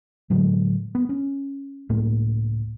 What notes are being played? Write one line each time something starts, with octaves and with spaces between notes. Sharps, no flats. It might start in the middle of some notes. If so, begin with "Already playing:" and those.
A2 D3 F#3 G#3
B3
C#4
C#2 A2 A#3